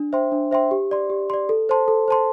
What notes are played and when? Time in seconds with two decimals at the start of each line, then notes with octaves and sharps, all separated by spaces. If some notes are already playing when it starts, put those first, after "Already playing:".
Already playing: D4
0.13 C5 E5 G5 C6
0.32 D4
0.51 C5 E5 G5 C6
0.71 G4
0.91 D5 C6
1.10 G4
1.30 D5 C6
1.49 A4
1.69 C5 A5 C6
1.88 A4
2.08 C5 A5 C6